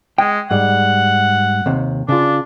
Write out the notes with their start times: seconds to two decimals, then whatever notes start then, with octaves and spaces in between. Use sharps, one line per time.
0.18 G#3 G5
0.51 G#2 G3 F#5
1.66 D#2 C3
2.09 C#3 D4 F4